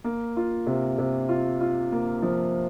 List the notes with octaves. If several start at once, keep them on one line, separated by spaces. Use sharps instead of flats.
A#3
F4
C3
C3
F4
F4
A#3
F3